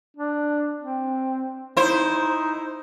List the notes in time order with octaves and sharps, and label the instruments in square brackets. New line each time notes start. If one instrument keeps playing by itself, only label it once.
[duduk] D4
C4
[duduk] D#4 [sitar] E4 C5